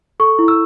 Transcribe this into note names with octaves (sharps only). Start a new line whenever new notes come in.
A4 C#6
E4
E6